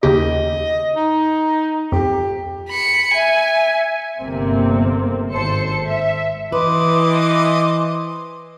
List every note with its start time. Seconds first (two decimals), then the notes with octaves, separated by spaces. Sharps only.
0.03 D#2 C#3 G4 D#5
0.96 D#4
1.92 F2 G4
2.69 B5 C#7
3.14 E5 G#5
4.19 G1 C3 A#3 C4
5.31 G#1 A4 C5 C#7
5.85 E5
6.52 E3 B4 C5 D#5 D6